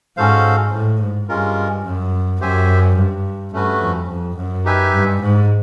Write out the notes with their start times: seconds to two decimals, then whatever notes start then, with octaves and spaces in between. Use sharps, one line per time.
0.17 G#2 C#4 F#4 A4 C5 F5
0.73 A2
1.01 G#2
1.29 G2 G#3 C#4 F4 A#4
1.85 F#2
2.41 F#2 G4 C5 E5 G#5
2.97 G2
3.53 G2 A3 C#4 F#4 B4
3.81 F2
4.09 F2
4.37 F#2
4.65 D#4 G4 B4 E5 G#5
4.93 G2
5.21 G#2